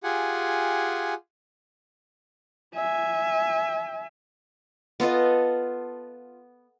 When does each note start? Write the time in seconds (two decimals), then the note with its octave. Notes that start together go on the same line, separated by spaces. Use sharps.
0.03 F4 G4 G#4 F#5 G#5
2.75 E5 G#5
5.00 B3 F4 A4 D#5